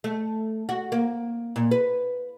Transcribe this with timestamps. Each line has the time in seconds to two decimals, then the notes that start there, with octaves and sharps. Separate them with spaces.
0.04 A3
0.69 F#4
0.92 A#3
1.56 A#2
1.71 B4